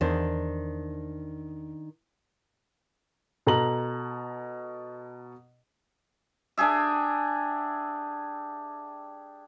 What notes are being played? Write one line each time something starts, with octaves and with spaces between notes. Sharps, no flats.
E2 D#3 D4 C5
B2 A4 A#5 F#7
D4 G4 G#4 E5